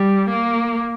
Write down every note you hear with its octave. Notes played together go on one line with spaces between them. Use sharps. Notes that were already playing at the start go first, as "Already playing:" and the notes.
Already playing: G3
A#3